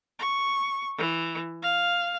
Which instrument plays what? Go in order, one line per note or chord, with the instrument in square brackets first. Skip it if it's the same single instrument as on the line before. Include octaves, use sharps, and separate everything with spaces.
[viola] C#6
E3
F5